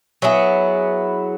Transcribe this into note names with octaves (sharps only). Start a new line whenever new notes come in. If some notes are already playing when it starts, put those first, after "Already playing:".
F#3 B3 E4 G#4